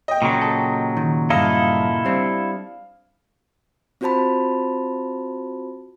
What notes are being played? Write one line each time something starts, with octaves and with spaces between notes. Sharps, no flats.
D#5 G5
A#2 C#3 F#3
A4
D#3
E2 G2 E4 A4 D#5 F5
G3 C4 D4
C4 F4 F#4 C5 A5 B5